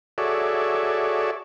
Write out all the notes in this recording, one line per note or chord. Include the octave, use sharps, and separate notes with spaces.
F#4 G#4 A4 C#5 D5 E5